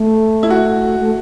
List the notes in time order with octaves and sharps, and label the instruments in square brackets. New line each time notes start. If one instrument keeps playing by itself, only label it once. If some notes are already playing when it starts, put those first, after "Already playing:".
Already playing: [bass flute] A3
[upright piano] E4
F#4
[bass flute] A3